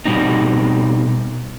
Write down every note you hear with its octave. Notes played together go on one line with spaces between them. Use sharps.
B2 G3 C4 D#4